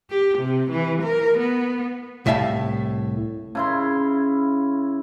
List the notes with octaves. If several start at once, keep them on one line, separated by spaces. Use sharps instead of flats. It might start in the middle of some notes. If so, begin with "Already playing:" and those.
G4
C3
E3
A#4
B3
C2 A2 E5 F5 G#5 A5
C#3 E4 C6